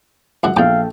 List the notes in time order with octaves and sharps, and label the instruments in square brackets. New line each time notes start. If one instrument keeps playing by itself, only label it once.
[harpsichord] C#2 F#2 E3 [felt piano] F#5
[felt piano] A#1 [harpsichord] E2 D6 [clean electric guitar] A4 G5 [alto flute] F5